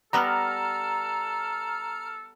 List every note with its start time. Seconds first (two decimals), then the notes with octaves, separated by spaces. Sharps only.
0.13 G3 B3 A4 B4 A#5 F6